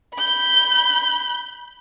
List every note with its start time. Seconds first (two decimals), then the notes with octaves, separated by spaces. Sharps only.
0.14 B5 G6